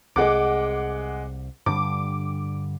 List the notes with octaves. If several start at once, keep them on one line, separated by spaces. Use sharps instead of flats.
C2 G#3 F#5 D6
G2 D3 G3 D6